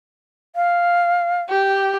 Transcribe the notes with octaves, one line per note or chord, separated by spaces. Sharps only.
F5
G4